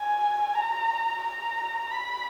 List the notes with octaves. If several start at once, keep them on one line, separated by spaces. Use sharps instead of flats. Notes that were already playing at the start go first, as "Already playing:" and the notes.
Already playing: G#5
A#5
A#5
B5